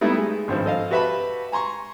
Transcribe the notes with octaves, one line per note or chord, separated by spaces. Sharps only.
G3 A3 B3 D#4 E4
G#3
G#1 G2 F3
A4 D#5 F5
F#4 G4 B4 E5 A5 B5
G#5 A#5 C6 C#6